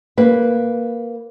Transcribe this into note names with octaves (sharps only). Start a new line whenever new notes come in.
A#3 B4